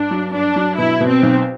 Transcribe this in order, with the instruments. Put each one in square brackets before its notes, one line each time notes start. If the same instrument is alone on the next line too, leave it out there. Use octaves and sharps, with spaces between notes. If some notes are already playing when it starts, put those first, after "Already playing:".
Already playing: [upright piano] G2 [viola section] D4
[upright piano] F#3
[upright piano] G2 [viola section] D4
[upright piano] F#3
[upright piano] B2 [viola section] E4
[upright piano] B2
[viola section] C4
[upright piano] B1